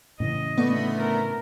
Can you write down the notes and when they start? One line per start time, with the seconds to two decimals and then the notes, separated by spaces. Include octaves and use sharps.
0.20 A2 C#3 E3 D#5
0.58 D3 A3 B3
1.00 A#4